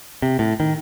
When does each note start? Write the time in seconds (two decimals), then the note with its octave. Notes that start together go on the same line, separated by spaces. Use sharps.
0.22 C3
0.39 A2
0.60 D#3